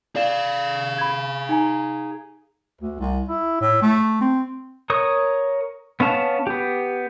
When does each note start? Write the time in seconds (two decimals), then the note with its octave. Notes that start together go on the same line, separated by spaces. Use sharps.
0.16 G#4 D5 F5 E7
0.98 B5 G#6
1.49 D#4 G#5 A#5
2.81 D2
2.99 C2
3.28 E4
3.61 A2
3.82 A3
4.21 C4
4.90 A#4 C#5 D#6
6.00 B3 C#4 F5 A5
6.47 B3 G4